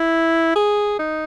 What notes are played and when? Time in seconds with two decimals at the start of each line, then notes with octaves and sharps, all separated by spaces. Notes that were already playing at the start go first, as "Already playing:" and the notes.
Already playing: E4
0.56 G#4
0.99 D#4